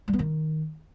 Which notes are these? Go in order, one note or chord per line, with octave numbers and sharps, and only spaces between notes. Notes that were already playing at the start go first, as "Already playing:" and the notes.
G3
B3
D#3